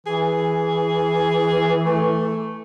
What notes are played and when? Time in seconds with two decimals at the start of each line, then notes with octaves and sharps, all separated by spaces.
0.07 E3 G#4
1.86 A3